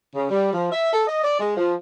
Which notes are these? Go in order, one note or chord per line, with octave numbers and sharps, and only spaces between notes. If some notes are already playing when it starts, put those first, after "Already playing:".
C#3
G3
F3
E5
A4
D#5
D5
G#3
F3